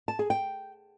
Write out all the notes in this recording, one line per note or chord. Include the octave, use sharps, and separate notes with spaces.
A5
G#4
G5